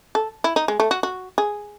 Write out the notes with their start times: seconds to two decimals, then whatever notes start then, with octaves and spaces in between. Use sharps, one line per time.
0.15 A4
0.44 E4
0.56 D#4
0.68 G#3
0.80 A3
0.91 F#4
1.03 F#4
1.38 G#4